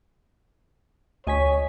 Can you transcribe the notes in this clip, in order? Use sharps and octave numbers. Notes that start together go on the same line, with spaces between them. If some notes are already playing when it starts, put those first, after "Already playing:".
D2 C#5 D#5 G#5 B6